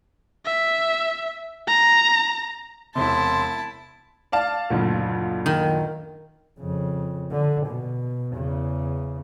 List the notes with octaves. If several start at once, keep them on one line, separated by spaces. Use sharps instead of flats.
E5
A#5
E1 C3 E4 A5 C6
D5 F5 A5
F#1 D2 A#2
D#3
F2 C#3
D3
B2
E2 C#3